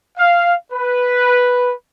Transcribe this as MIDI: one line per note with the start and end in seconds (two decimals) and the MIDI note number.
0.18 0.54 77
0.72 1.72 71